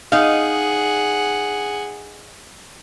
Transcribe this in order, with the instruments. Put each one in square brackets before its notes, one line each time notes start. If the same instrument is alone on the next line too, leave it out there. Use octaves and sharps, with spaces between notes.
[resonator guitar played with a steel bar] D#4 F5 [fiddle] G#4 F#5